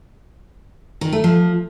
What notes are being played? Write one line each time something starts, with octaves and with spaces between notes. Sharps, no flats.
D#3
A3
F3